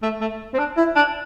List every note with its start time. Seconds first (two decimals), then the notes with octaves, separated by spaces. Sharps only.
0.02 A3
0.21 A3
0.54 C4
0.58 D4
0.77 E4
0.96 D4